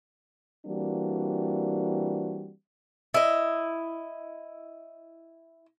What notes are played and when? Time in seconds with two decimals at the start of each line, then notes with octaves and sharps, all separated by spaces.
0.66 E3 G3 A#3 C4 D4 F#4
3.14 E4 D#5